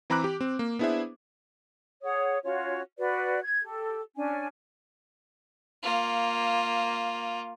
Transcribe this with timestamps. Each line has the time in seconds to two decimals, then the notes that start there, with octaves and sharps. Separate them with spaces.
0.10 E3 C4 A#5 B5 D6 F#6
0.24 G4
0.41 C4
0.59 A#3
0.79 B3 D4 E4 G#4 C5 E5
2.03 G#4 C#5 F#5 D#6
2.44 C#4 F4 F#4 C#5
2.98 F#4 B4 D5
3.44 G#6
3.61 G4 A4
4.16 C#4 D4 G#5
5.83 A#3 F4